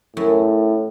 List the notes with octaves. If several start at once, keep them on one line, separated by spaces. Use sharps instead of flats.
F#2 A2